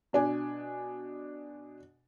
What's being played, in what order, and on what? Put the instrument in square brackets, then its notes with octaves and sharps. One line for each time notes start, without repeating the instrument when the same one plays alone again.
[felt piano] B2 D4 G#5